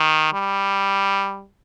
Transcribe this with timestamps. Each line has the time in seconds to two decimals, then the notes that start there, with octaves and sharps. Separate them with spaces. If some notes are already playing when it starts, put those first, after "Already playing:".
Already playing: D#3
0.34 G3